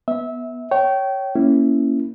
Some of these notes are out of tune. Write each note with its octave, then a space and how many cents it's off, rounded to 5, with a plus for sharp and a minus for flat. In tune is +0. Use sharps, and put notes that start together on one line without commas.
B3 -10 E5 -20
C#5 +0 G5 -25
A#3 +0 C#4 +0 E4 +0